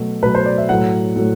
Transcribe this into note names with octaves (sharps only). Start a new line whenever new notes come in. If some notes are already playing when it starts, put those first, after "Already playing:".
Already playing: B2 F#3 A3
B2 F#3 A3 B4
C5
D5
E5
A2 F#3 A3 F#5
A2 F#3 A3